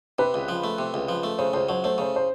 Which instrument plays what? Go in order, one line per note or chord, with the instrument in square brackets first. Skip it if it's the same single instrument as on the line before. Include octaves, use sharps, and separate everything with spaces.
[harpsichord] C3 [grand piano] B4
[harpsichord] C#2
F3
A3
C3
C#2
F3
A3
[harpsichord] C#3 [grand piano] C5
[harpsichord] C#2 [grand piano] C5
[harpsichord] F#3 [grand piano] C5
[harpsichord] A3 [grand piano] C5
[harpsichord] C#3 [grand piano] C5
[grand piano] C5